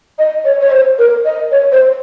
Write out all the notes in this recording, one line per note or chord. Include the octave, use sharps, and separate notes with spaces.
D#5
C#5
C#5
C5
A#4
D#5
C#5
C5